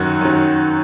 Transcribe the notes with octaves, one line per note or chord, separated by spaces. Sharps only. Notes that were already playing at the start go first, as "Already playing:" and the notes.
Already playing: F#2 D#3 F#3 F#4
F#2 D#3 F#3